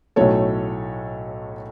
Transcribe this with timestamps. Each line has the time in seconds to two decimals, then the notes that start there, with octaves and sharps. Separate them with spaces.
0.16 B1 A2 F#3 A3 A4 C#5